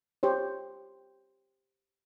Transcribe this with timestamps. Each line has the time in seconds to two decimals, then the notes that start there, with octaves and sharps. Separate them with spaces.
0.23 G4 C5 C#5